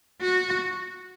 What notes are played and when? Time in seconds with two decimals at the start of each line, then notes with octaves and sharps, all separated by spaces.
0.21 F#4